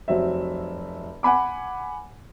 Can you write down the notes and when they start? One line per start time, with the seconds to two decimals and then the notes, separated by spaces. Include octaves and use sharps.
0.08 F1 F#3 C4 E5
1.23 F#5 G#5 B5 D6